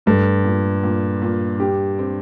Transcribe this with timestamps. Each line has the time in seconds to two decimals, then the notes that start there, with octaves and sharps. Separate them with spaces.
0.06 G2 A3
0.45 A#2
0.83 A#2
1.22 A#2
1.60 G4
1.99 C4